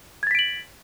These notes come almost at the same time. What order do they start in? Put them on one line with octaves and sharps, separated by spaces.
G#6 A6 B6 D7 F#7